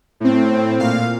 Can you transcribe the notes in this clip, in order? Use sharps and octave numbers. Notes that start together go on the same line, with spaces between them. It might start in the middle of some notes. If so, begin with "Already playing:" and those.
A2 C4
A#2 F5